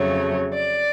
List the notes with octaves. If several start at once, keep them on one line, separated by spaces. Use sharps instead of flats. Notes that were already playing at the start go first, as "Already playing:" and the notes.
Already playing: F2 C#3 F#3 A3 C#5
D5